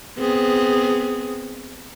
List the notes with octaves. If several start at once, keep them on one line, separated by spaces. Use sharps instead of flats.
B3 C4 G#4